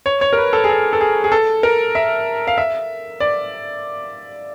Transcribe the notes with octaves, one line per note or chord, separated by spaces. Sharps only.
C#5
C#5
A#4
B4
A4
G#4
A4
A4
G#4
G#4
A4
A#4
E5
F5
E5
D5